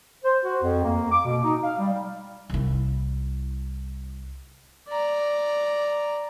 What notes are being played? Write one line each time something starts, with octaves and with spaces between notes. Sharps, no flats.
C5
F#4
F2
A#3
D6
B2
D#4
F5
G3
C2 E4
D5 A#5